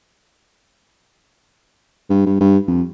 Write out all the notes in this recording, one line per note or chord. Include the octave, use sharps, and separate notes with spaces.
G2
G2
G2
F2